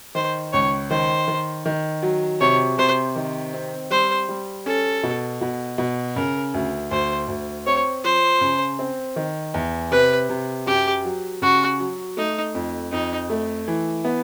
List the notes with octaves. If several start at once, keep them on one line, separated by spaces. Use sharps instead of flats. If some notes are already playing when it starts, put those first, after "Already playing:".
D#3 C5
C#2 C#5
D#3 C5
D#3
D#3
F#3
C3 C#5
C3 C5
D#3
C4
G3 C5
G3
C#4 A4
B2
B2
B2
C#3 A#4
D2
D2 C5
D2
C4 C#5
F3 C5
C#3
C4
D#3
E2
C3 B4
C3
F#2 G4
F#3
C#3 F#4
F#3
A3 D#4
F2
F2 D#4
A3
E3
B3